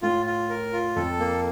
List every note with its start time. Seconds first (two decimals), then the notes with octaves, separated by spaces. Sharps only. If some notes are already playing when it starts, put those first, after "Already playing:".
0.02 A2 F4
0.26 F4
0.50 A#4
0.73 F4
0.96 F2 A4
1.20 A#3